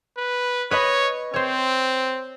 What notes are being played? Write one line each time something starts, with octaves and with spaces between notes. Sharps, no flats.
B4
B4 C#5 D#5 B5
C4 C5 C#5